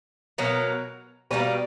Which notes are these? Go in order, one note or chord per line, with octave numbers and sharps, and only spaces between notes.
B2 F#3 A#3
B2 G3 A#3 B3 C#4